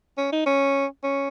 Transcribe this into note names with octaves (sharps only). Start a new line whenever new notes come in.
C#4
D#4
C#4
C#4